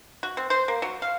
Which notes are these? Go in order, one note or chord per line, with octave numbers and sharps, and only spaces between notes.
F#4
C4
C5
A#3
F#3
F5